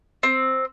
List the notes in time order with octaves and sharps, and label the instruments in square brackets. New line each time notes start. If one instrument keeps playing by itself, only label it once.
[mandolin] C4